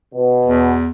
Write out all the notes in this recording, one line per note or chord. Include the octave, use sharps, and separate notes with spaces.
B2
E2